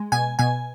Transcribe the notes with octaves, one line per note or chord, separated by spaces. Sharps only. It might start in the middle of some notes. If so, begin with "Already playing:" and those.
Already playing: G#3
B2 G#5
B2 G#5